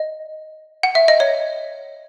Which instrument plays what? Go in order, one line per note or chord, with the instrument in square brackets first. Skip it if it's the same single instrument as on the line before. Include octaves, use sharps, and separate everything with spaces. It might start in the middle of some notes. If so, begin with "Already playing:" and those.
Already playing: [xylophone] D#5
F#5
E5
D#5
C#5